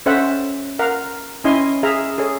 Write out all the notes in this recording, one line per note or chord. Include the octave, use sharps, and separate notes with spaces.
C#4 A4 C5 C#5 E5 F#5
A#4 F5 F#5 A#5
C#4 E4 D#5 G#5 C6
G#4 E5 F5 A#5
G#4 A4 C#5